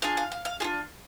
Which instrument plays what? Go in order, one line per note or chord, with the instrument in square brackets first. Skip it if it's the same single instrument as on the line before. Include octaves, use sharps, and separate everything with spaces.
[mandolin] D4 F4 G#4 F5
F5
F5
F5
D4 F4 G#4